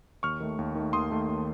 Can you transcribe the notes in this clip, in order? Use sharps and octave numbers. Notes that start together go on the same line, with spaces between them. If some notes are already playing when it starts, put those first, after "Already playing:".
D#2 C#6 F6
D#3 A3
D#2
D#3 A3
D#2 C6 D#6
D#3 A3
D#2